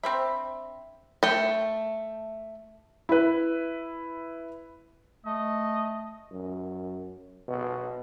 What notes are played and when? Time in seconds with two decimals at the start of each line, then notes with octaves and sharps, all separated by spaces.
0.03 C4 D4 C5 E5 B5
1.23 A3 G5
3.09 E4 B4
5.26 A3 D#5
6.31 F#2
7.48 B2